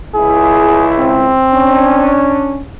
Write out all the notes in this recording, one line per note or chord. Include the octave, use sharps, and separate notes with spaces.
C#2 E4 G#4
C4
C#4 D4